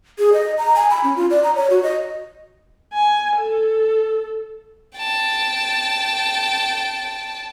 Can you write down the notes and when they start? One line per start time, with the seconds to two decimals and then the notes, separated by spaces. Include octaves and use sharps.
0.19 G#4
0.33 D#5
0.58 A#5
0.76 G#5
0.91 B5
1.04 C#4
1.16 F4
1.30 D5
1.44 A#5
1.55 C#5
1.70 F#4
1.83 D#5
2.93 G#5
3.37 A4
4.97 G5 A5